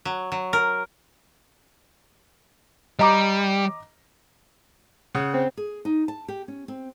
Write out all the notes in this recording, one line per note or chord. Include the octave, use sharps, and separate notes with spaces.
F#3
F#3
A#4
G3 D#5 A#5 D6
C#3 F#5 D#6
C4
G#4
D#4
A5
G4
C#4
C4